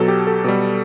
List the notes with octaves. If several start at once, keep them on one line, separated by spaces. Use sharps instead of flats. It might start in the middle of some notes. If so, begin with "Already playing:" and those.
Already playing: B2 F#3 A4
G4
A4
B2 G3